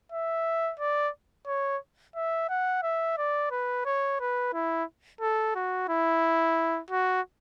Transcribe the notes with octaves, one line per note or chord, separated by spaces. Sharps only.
E5
D5
C#5
E5
F#5
E5
D5
B4
C#5
B4
E4
A4
F#4
E4
F#4